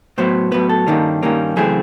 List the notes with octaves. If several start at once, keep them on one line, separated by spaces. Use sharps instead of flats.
A2 F#3 B3 C5
A2 F#3 B3 B4
A4
G2 D#3 G3 A#3 C#4
G2 D#3 G3 A#3 C#4
F#2 C#3 E3 A3 C4 G#4